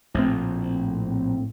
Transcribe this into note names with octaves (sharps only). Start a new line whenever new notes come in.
A#1 A2 C4